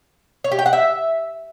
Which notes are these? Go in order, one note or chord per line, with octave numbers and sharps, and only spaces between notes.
C#5
G4
G5
F#5
E5